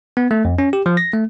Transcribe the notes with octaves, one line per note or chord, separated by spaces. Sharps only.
B3
A3
F2
C#4
G4
F3
A#6
A3